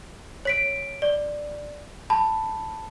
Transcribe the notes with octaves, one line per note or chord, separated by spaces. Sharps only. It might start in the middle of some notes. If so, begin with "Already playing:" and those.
C#5 B6 D7
D5
A5 B5